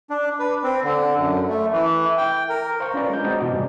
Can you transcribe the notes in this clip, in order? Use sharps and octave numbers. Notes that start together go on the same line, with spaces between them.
D4
B4
C4
D3
F#2
A3
E3
G5
A#4
C5 F5 C#6
C#4 D4 F4 B4 D5 A#5
G#3 G6
C4 F#4 D#5 G5 A5 A#5
B2 E3 F#4 D6
G2 C3 G#3 D5